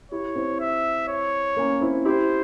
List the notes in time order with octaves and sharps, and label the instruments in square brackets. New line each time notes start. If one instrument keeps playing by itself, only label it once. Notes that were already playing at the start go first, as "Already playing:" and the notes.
[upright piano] E4 G4 [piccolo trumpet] C#5
[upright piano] C4 E4
[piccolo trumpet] E5
C#5
[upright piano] A#3 C#4
C4 E4
[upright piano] E4 G4 [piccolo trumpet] C5